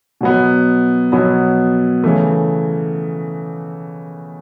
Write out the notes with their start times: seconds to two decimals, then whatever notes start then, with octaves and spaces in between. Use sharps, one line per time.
0.21 B2 F#3 B3
1.12 B2 F#3 B3
2.04 C#3 E3 A3